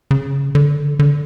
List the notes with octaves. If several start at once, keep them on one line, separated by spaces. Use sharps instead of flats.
C#3
D3
D3